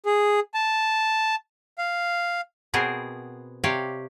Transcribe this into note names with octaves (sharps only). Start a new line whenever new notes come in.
G#4
A5
F5
B2 B3 C4 G#4 A#4 C5
C3 G4 C#5 D5 F5